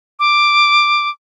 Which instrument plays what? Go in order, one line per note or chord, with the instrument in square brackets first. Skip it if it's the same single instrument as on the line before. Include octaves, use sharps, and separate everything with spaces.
[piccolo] D6